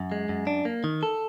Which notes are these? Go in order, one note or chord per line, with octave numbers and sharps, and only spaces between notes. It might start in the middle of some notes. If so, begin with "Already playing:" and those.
Already playing: F#2
G#3
F#2
D4
A#3
D#3
A4